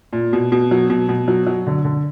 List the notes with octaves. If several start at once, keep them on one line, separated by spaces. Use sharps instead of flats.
A#2
B2
B2
F#3
B2
B2
F#3
F#3
D3
D3